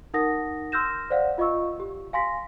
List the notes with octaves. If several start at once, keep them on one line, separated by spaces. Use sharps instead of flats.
D#4 A#4 F#5 D#6 A#6
C6 E6 F6 G6 A#6 E7
C5 D5 F5 F#5
F4 D#5 F5 C#6 E6
G4
F5 G#5 C6 A#6 B6